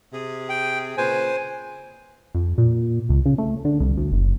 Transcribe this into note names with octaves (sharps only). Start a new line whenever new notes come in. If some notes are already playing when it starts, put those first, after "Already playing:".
C3 G#4
G5
A#2 C#3 B4 C5 G#5
F2
A#2
C#2
C#3
A3
D3
C2
D2
F#1